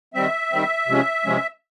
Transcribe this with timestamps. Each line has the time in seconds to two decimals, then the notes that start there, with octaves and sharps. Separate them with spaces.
0.14 D#3 G3 C4 E5
0.51 D#3 G3 C4
0.88 C3 F3 G#3 C#4
1.25 C3 F3 G#3 C#4